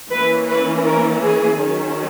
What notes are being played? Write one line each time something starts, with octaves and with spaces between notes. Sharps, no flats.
E3 A#3 C#4 B4
B4
A#4
G#4
D#3 F#3 C#4